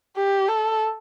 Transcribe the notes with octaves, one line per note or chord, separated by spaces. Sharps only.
G4
A4